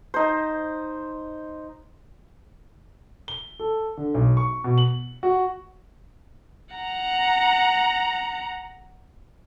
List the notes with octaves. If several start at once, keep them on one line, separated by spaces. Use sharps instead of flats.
D#4 C5
G7
A4
D3
B1
C#6
B2
F#7
F#4
F#5 A#5